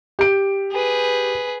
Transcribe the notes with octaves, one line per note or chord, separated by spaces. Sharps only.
G4 D7
G#4 B4